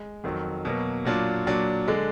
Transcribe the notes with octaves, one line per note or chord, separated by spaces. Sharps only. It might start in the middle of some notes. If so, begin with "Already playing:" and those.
Already playing: G#3
F2 D#3 F#3
B2 F#3 A#3
A#2 F#3 D4 F4
A#2 F#3 D4
D3 G#3 D4